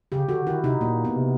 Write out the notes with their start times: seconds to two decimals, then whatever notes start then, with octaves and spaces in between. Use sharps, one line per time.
0.12 C#3 G4
0.29 D3 F#4
0.46 D#3 E4
0.64 C3 D#4
0.81 A#2 A#3
1.05 B3
1.16 C3